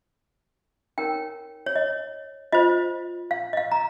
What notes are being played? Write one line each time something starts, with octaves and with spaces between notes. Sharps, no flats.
D#4 A#4 C#5 G5
C#5
D#5
F4 C5 D#5
F5
D#5
F5
A#5